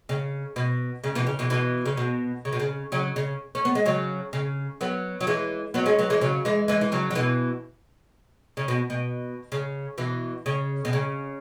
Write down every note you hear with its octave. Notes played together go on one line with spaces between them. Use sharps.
C#3
B2
C#3
B2 E3
C#3
B2 E3
B2 E3
C#3
B2
C#3
B2
C#3
C#3 F#3
C#3
C#4
B3
G#3
C#3 F#3
C#3
F#3 B3
F#3
E3 G#3
F#3 B3
G#3 C#4
F#3 B3
E3 G#3
C#3 F#3
E3 G#3
E3 G#3
E3
C#3 F#3
F#3
B2 E3
C#3
B2
B2
C#3
B2 E3
C#3
B2
C#3